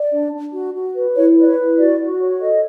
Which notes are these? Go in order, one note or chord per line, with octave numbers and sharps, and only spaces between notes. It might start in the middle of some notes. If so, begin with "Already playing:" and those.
Already playing: D5
D4
D4
F#4
F#4
B4
E4 C#5
B4
D5
C#5
E4
F#4 D5
F#4
C#5
A4 D#5